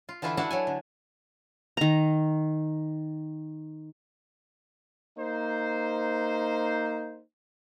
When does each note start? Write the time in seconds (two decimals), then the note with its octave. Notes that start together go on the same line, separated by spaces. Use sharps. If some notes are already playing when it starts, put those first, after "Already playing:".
0.09 F4
0.22 D3 E3 E4 F4 B4 E5
0.37 D4 E4 F#4 B4 F5 F#5
0.51 F#3 A4 G#5
0.67 D3
1.77 D#3 A#5
5.18 A#3 D#4 C5